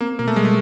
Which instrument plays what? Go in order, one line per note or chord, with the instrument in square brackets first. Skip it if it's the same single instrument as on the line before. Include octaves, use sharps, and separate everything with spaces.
[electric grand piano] A#3 [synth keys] C4
[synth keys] B2 [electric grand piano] A#3
[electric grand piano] A3
[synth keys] G3 [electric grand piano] G#3
[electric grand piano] A3